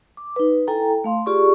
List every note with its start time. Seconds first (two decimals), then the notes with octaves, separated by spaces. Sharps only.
0.17 D6
0.36 D#4 B4
0.68 E4 A4 G5 G#5 A#5
1.04 A3 F5 C6
1.26 F4 G4 G#4 D5 C#6